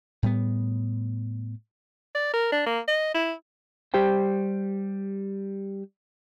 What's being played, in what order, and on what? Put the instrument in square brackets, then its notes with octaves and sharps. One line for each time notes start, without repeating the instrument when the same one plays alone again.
[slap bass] A2 G3 B3
[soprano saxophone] D5
A#4
D4
A#3
D#5
E4
[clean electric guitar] G3 G4 C5 G5